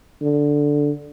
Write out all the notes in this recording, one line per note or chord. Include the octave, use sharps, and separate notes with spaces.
D3